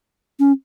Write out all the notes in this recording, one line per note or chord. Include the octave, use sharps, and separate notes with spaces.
C#4